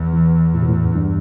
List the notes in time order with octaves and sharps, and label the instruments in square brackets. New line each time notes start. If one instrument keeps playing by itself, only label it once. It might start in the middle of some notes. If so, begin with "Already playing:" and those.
Already playing: [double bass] E2
[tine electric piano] E3
A2
B2
A2
F#2
G2